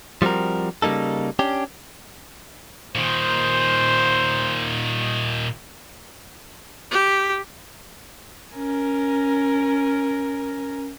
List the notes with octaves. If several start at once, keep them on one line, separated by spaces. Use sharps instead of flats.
F3 G3 C4 F#4 A#4
C#3 G3 A#3 D#4 A4
C#4 D4 G4
A#2 D#3 C5
G4
C#4 A#4